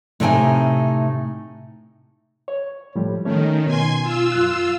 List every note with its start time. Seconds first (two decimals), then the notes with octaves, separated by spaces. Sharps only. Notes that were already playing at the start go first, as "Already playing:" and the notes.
0.20 A2 C3 D#4 G5 G#5
2.48 C#5
2.95 A2 F3 G3
3.25 D#3 A3 C#4 C#5
3.66 B2 G#5 C6 G#6
4.02 F4 E6
4.32 F#2 F#6